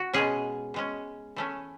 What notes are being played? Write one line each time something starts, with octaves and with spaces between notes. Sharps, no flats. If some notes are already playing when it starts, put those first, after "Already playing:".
Already playing: F#4
B2 G#3 C#4 G#4
B2 G#3 C#4
E3 A3 C#4